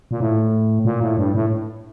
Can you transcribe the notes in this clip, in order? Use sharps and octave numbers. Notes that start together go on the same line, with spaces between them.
A#2
A2
A#2
A2
G2
A2